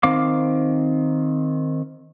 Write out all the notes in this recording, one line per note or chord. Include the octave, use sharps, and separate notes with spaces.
D#3 C4 F5 D6